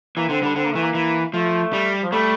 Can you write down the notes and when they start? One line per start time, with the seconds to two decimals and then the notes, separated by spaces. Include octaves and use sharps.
0.17 E3 A#3
0.29 D3 C4
0.42 D3 G3
0.56 D3 C4
0.64 A#3
0.72 E3 A3
0.82 A#3
0.95 E3
1.34 F3 A3
1.73 G3
2.03 F3
2.12 G3 A3